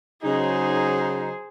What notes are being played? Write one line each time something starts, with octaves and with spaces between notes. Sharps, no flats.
C#3 F#3 D#4 G#4 C5